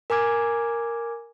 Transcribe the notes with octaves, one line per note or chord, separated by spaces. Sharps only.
A#4 G#5 A#5 D6 F6 G#6